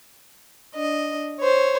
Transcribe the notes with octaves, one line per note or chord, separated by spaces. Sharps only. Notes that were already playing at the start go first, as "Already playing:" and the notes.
D4 D#5
C5 C#5